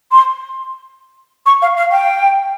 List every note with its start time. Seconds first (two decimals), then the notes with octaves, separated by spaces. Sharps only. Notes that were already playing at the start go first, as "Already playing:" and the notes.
0.12 C6
1.46 C#6
1.62 F5
1.77 F5
1.92 G5